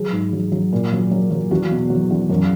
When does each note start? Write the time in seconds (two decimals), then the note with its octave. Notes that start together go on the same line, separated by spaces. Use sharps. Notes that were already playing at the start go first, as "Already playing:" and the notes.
Already playing: F#3 G#4
0.12 G#2
0.33 F#3
0.52 F#3
0.73 A#2
0.92 F#3
1.11 F#3
1.31 F#3
1.51 E2 F#4
1.71 B2
1.90 F#3
2.11 E2
2.30 F#2